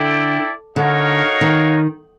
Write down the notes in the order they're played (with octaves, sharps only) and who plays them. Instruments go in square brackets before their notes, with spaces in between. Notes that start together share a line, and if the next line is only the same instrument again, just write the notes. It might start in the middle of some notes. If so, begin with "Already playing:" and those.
Already playing: [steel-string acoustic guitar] D3 [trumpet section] E4 A4 D5 G5
[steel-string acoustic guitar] D3 [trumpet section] D#4 F#4 A#4 C#5 F5
[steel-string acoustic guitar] D#3